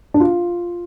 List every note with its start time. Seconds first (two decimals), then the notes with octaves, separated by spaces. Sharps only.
0.14 D4
0.20 F4